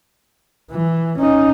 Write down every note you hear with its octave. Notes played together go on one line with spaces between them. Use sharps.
E3
C#4 D#4